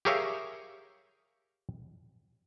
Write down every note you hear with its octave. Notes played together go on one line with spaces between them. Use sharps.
G4 G#4 A#4 C#5 E5 F5